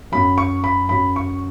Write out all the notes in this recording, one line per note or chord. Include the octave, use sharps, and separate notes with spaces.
F#2 F#3 B5
C#6
B5
F#2 F#3 B5
C#6